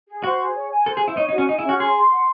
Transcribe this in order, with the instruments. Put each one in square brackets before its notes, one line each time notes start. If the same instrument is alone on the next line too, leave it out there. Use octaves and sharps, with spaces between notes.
[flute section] G#4
[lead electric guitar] F#4 [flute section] C5
[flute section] G#4
C#5
G#5
[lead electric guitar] A4 [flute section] C5
[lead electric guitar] G#4
[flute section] C5
[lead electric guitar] E4
[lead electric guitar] D#4 [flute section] C#5
[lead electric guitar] D#4
[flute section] F#4
[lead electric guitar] C#4
[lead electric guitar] D#4 [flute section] G#4
[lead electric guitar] E4
[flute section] C#4 [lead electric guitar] F#4
[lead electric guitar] G#4 [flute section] C6
[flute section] C6
F#5